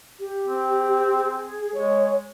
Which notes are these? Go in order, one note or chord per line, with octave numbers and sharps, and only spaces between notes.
G4
C4
G#4
G#3 C#5